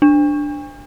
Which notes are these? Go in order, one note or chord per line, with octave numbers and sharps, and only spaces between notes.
D4